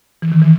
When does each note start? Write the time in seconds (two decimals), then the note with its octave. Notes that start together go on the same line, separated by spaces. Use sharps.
0.22 E3
0.32 D#3
0.42 E3